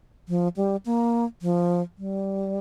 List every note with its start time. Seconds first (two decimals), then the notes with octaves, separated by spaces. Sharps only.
0.28 F3
0.57 G3
0.86 A#3
1.42 F3
1.98 G3